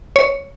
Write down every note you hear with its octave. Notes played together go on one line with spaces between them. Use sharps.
C#5